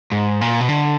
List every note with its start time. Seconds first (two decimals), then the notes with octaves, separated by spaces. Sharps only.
0.12 G#2
0.41 A#2
0.61 B2
0.69 D3